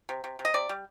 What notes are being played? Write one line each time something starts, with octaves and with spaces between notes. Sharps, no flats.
C3
C3
C3
D#5
C3 D5
G3